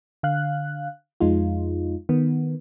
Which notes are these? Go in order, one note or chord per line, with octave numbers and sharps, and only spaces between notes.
D3 F5 F#6
F2 G#3 D#4 F4
D#3 B3